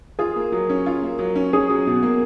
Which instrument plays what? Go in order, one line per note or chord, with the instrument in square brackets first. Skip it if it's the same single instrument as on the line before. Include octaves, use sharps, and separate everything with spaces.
[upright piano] F4 [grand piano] G#4
[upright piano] A#3
F#3
C#4
F4
A#3
F#3
C#4
[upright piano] C#4 [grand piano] G#4
[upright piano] F#3
B2
A#3